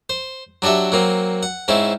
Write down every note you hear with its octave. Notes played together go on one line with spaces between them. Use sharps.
C5
F#3 D4 F#4 G4 E5
F#3 A#3 C4
F#5
G#2 C4 C#4 E4